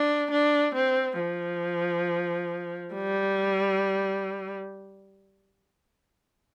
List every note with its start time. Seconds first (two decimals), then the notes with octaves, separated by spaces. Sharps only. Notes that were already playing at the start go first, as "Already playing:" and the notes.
Already playing: D4
0.31 D4
0.74 C4
1.19 F3
2.95 G3